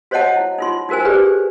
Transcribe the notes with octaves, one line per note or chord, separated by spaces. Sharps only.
F#4 C5 C#5 D#5 F#5 A5
E4
D#4 F4 C6
D#4 F#4 A#4 C5 G#5
G4 G#4 B4 C5 D5